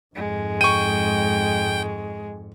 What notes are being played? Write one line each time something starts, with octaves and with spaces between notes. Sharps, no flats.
F2 G#2 G#3
G5 C#6 D#7